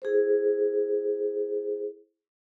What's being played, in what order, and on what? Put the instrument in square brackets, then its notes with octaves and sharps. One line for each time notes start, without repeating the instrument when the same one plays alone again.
[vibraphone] E4 G#4 A4 C5